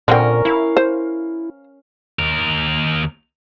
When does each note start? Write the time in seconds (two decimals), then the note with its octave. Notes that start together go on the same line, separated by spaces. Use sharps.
0.08 A#2 D3 C4 C#4 A#4 G5
0.45 E4 F5
0.77 C5
2.19 D#2 A#4